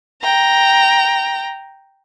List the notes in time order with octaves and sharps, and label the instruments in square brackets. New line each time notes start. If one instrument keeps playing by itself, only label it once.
[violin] G5 A#5